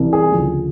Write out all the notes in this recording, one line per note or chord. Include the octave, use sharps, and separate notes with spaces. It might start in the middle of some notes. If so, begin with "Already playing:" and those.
Already playing: C2 C3 E3
G#4
D2 C#3 F3